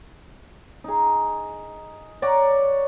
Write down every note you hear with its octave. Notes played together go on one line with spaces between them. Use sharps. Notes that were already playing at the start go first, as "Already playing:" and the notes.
D#4 G#4
C#5 D5 F#5 A#5